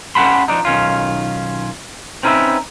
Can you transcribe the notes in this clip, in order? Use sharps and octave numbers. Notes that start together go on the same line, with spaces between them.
C#4 G4 F#5 A5 B5 C6
F3 D4 D#4
B1 D#3 C#4 F4
C4 C#4 D#4 G#4 B4 E5